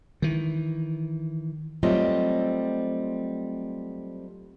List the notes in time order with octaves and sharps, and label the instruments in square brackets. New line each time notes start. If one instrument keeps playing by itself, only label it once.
[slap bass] D#3 E3
[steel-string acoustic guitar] F#3 G3 A3 C4 F4 D#5